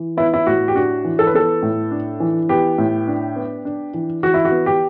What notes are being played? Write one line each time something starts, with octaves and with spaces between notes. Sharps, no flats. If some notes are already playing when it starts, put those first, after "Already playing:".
Already playing: E3
B3 E4
E4
A2 F#4
G4
D4 F#4
E3
A4
B4
B3 A4
A2
D4
E3
B3 G4
A2
D4
B3
D4
E3
E3 F#4
E4
F#4
B3
G4